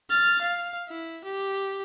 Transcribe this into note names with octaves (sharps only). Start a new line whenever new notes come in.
F6 A6
F5
E4
G4